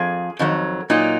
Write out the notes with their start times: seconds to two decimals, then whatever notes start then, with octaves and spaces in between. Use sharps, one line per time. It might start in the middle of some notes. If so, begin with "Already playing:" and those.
Already playing: F2 F3 G#4
0.39 F2 D#3 F#3
0.90 A#2 F#3 D#4